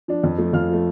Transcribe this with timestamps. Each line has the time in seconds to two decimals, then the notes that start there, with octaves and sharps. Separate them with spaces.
0.08 F3 D4
0.23 F2
0.38 F3 A3
0.53 F2 F5 F6
0.69 F3 A3